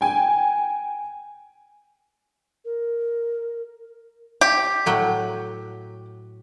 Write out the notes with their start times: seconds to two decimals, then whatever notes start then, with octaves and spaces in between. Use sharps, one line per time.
0.01 G5 G#5
2.65 A#4
4.41 G4
4.86 A2 F#3 G5